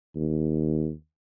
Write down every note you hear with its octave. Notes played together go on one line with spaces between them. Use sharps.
D#2